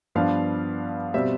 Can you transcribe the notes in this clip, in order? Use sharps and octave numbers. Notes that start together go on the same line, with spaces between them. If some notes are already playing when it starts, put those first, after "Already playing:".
G2 F3 B3 D4 F5
B2 G3 C4 E5